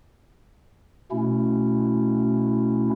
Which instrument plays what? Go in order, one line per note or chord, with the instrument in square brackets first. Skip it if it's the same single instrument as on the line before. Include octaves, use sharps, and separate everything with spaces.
[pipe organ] B2 A3 C#4 E4